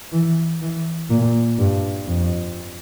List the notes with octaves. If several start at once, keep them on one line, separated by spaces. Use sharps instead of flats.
E3
E3
A#2
G2
F2